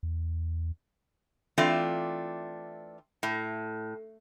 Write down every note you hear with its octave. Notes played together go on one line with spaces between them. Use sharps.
E2
E3 A3 C4 D4 F4
A2